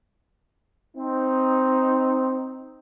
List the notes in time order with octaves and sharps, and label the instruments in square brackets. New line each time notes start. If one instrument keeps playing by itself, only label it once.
[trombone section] C4 D#4